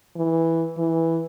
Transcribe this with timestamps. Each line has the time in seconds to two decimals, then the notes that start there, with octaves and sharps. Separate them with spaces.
0.16 E3
0.78 E3